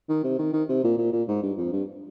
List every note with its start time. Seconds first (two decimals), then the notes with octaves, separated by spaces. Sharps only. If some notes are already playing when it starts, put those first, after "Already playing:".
0.09 D#3
0.24 C3
0.39 D#3
0.53 D#3
0.69 C3
0.84 A#2
0.98 A#2
1.13 A#2
1.28 G#2
1.43 G2
1.58 F2
1.73 G2